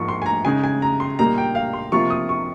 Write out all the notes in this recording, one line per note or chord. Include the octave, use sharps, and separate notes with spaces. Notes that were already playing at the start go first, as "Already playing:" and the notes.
Already playing: G#2 F3 A#3 C#6
C6
G#5
A#5
C#3 G#3 D#4 G#5
G#5
A#5
C6
A#2 G3 A#3 D#4 A#5
G5
F5
C6
C3 F3 A#3 F4 C#6
D#6
C#6